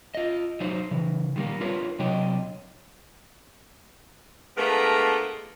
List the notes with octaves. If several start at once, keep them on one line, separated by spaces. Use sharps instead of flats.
F4 D#5
F#3 D#4 C5
C#3 E3
D#3 G3 A#3
D4 F4 A#4 B4 C#5
C3 F#3 D4 C#5 D#5 G5
G#3 A3 B3 D4 F4 A#4